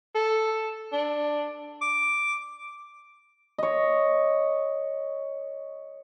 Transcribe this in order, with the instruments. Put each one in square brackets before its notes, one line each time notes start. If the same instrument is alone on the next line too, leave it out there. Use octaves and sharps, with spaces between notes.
[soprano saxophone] A4
D4
D6
[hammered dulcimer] C#5 D#5